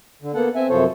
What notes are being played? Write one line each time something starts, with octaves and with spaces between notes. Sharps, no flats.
D3
A#3 B3 A4 F#5
C4 E5 G#5
F#2 C3 F3 A4 C5 C#5